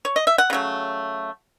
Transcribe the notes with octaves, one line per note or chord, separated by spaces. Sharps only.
C#5
D#5
E5
F#5
C#3 F#3 A3